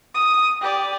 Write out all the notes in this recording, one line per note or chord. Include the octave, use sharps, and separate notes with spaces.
D#6
G4 D5